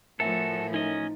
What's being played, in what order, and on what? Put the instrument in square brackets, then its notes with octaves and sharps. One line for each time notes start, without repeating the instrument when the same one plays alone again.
[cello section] A2 F3 [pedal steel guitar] F#4 A4 [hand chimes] A#4 E5 G#5
[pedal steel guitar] C#4 D#5 [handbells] D#4